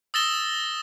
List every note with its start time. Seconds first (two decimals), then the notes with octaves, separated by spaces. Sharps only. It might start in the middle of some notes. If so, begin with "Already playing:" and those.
0.14 D#6 E6 A6 A#6 E7 G7